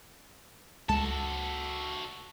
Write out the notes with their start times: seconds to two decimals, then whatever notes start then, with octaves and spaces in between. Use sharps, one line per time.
0.89 C#2 G#3 F#4 A4 A5